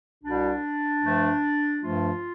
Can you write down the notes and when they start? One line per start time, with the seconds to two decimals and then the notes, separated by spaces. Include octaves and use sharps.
0.22 C2 B2 G3 D4
1.01 G2 F3 A3
1.81 G2 F3 A3 F4